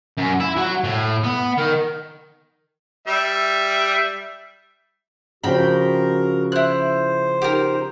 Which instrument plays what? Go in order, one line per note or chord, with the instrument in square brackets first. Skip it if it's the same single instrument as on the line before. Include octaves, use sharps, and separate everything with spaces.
[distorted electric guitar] F#2
E4
F#3
A2
B3
D#3
[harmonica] G3 E5
[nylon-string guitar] C#3 F3 D4 [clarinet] F#4 [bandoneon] A#4 A#5 [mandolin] G5 B5
[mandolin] E4 F#6 [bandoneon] C5
[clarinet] D#4 [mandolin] G4 A#4